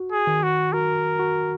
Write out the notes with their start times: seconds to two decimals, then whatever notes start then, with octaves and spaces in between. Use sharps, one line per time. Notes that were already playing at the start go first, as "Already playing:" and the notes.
Already playing: F#4
0.12 G#4
0.27 D#3
0.43 F#4
0.73 F#4 A#4
1.19 F#4